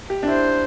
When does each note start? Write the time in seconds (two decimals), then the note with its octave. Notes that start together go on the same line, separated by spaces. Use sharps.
0.10 G4
0.23 D4
0.27 E4 C5